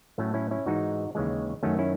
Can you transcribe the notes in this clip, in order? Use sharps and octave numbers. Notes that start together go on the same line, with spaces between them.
A2 F#3 A3 C#4
C#4 E4
C#4 E4
G#2 E3 G#3 D#4 F#4
D#2 C#3 E3 G#3
F#2 D#3 F#3 A3 C#4
C#4 E4